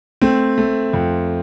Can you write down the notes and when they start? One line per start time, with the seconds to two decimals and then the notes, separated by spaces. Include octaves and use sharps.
0.21 A3 C4
0.58 A3
0.93 F2